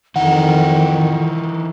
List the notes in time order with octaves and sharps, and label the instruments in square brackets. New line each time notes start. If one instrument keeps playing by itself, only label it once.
[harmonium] F2 [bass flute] D#3 [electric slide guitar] E3 D#4 [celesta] F#5